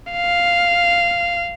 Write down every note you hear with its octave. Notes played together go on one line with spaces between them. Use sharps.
F5